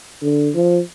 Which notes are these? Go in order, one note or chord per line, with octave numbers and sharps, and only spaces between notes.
D3
F3